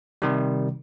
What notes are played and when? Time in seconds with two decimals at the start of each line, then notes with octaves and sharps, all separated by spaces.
0.22 C3 D#3 G3